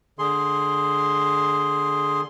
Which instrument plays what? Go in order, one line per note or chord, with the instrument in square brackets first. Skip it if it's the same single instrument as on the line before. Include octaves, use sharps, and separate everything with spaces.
[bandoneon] D3 G#4 C6